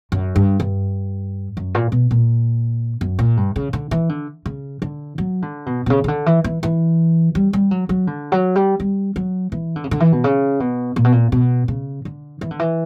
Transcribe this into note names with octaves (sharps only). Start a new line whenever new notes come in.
F#2
G2
G2
F#2
A#2
B2
A#2
F#2
A#2
G2
C#3
D3
E3
D3
C#3
D3
F#3
D3
B2
B2
C#3
C#3
D3
E3
E3
E3
G3
G3
F#3
F#3
D3
F#3
G3
G3
F#3
E3
D3
C#3
D3
E3
B2
C#3
B2
A#2
B2
A#2
B2
C#3
D3
E3
D3
E3